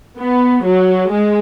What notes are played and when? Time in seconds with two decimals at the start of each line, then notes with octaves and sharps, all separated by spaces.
0.18 B3
0.64 F#3
1.10 G#3